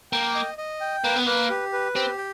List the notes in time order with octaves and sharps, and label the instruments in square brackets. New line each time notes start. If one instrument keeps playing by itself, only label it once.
[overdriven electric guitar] A#3 [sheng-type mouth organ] G5
[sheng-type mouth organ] D#5
D#5
G5
[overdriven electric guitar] A#3 [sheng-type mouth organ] B4
[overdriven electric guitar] B3
[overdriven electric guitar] A#3 [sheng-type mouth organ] B4
[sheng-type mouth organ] G4
B4
[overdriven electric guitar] C4 [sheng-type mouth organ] G4
[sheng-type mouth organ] G5